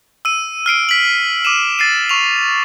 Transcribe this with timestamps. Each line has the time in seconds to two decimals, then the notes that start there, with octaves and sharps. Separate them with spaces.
0.25 E6 D#7
0.66 F6 C7 D7 D#7
0.89 B6 F#7
1.45 D6 D#7 E7
1.79 A6 C7 D#7
2.09 C#6 F7